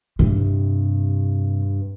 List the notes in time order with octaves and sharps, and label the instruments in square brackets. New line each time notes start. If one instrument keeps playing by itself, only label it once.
[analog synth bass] G2 [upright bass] C3